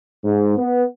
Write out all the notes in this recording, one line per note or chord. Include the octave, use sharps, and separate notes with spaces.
G#2
B3